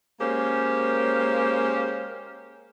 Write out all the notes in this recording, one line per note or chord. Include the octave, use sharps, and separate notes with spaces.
G#3 A#3 C#4 G4 A#4 C5